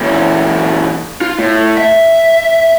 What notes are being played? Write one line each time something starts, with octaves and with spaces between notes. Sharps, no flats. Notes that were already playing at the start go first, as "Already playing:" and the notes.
A#2 E3
F4
A2
E5